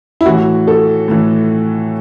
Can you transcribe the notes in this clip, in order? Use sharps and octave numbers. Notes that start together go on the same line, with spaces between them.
E4
A2 E3 F#4
A4
A2 E3